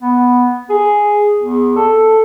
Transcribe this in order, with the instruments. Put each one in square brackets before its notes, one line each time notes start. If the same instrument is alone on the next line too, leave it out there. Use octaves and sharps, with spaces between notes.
[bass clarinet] B3
G#4
E2
A4